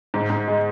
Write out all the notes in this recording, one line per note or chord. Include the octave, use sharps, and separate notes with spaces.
G#2
G#2
G#3